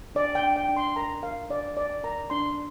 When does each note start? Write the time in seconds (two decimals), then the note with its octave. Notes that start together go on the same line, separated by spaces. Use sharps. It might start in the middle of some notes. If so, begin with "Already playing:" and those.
0.15 D4 D5
0.35 G5
0.42 D4
0.56 G5
0.69 D4
0.77 C6
0.96 A#4 A#5
1.23 A#4 F5
1.50 D4 D5
1.76 A#4 D5
2.04 A#4 A#5
2.30 D4 C6